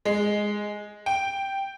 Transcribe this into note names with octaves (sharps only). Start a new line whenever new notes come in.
G#3
G5